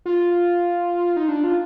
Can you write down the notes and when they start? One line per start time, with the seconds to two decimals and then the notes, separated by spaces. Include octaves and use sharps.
0.06 F4
1.16 D#4
1.28 D4
1.44 F4